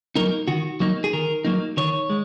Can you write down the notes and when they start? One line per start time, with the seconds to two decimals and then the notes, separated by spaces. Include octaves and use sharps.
0.16 F#3 A#3 D#4 A#4
0.48 D#3 F#4
0.80 F#3 A#3 D#4
1.04 G#4
1.13 D#3 A#4
1.45 F#3 A#3 D#4
1.77 D#3 C#5
2.10 G#3